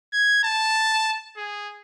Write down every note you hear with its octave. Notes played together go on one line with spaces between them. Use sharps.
G#6
A5
G#4